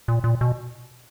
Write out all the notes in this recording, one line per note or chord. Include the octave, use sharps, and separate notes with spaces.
A#2
A#2
B2